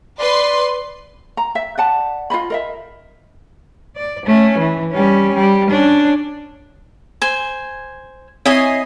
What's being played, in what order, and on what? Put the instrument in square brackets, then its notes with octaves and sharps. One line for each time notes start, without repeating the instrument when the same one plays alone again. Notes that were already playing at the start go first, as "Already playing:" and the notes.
[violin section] B4 C6 [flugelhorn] D5
[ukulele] A#5
E5
D5 F#5 A5
F4 C5 D#5 B5
A#4 D#5 E5
[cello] D5
A3 C#4
E3
G3 C#4
G3
C#4 D4
[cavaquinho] C5 G#5
[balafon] C4 [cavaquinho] E4 D#5 G#5 [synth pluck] C#5 D#6 C7